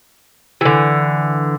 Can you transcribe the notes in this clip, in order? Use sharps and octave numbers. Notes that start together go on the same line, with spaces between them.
D3 E3